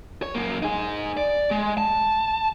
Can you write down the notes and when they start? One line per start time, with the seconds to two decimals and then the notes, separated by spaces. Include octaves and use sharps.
0.23 C#5
0.35 F#2 A#3
0.62 D#4 G#4
1.17 D5
1.51 G#3
1.78 A5